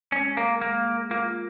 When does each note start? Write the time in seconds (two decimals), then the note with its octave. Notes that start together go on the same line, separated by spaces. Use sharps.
0.12 G#3 C#4
0.37 A#3 A#4
0.61 G#3 A#3
0.86 G#3
1.10 A#3 F4